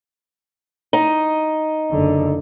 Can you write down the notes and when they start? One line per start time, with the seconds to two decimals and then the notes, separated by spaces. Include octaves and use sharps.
0.93 D#4
1.91 F#1 D3